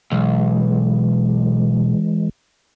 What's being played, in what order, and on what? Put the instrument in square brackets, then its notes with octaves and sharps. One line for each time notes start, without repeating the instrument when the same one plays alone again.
[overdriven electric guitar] B1 [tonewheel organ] E3 G#3